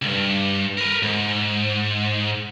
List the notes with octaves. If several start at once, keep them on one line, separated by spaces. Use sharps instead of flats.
C#2 G2
A#4 B4
G#2